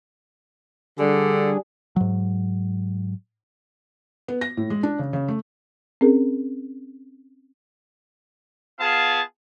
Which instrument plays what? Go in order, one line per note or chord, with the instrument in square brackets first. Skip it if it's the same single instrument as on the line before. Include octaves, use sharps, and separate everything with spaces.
[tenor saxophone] D3 [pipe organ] G3 D4 G#4
[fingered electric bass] G#2 F#3
[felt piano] B3
A#6
A2
G#3
D4
C#3
C#3
A3
[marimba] C4 C#4 G#4 A#4
[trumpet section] B3 F4 G#4 F5 A5